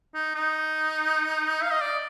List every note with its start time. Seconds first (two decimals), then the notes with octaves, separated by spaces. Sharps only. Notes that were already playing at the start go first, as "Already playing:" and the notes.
0.14 D#4
0.35 D#4
1.62 F5
1.71 D#5
1.81 D5